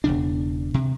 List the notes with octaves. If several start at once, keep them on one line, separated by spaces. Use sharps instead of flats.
E1 E2 C#3 D4
C3